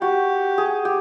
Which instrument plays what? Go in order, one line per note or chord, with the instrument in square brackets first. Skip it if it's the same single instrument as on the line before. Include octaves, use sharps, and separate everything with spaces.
[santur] F#4 [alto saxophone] G4
[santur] G#4
G4